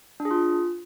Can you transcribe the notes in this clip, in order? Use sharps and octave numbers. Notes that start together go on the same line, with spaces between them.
D4
G#4
F4